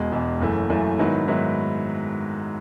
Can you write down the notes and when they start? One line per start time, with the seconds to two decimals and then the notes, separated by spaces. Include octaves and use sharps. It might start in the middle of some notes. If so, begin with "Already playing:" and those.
Already playing: E1 B2 G#3
0.12 E1 E2 B2 G#3
0.40 F#1 F#2 E3 A3
0.69 F#1 F#2 E3 A3
0.98 G#2 D#3 F#3 B3 E4
1.28 G#2 D#3 F#3 B3 E4